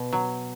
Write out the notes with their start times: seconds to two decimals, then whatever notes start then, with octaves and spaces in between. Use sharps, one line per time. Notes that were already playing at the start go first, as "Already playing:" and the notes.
Already playing: B2
0.13 F#3